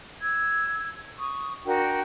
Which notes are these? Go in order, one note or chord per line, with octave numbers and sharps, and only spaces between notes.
E6 G#6
C#6 D#6
D4 F#4 A#4 G5